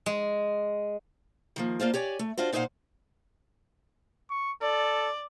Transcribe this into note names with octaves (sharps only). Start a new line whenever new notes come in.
G#3
D#3 F3 A#3
A#3 D4 F4 C5
G4 C#5 D5 G#5
A3
D4 F4 F#4 C5
A#2 D#4 C5 D5 F5 F#5
C#6
A4 D5